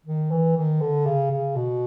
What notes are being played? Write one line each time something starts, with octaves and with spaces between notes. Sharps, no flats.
D#3
E3
D#3
D3
C#3
C#3
B2